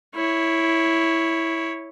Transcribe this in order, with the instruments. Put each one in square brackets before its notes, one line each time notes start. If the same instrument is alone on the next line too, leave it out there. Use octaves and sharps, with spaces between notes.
[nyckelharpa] E4 C#5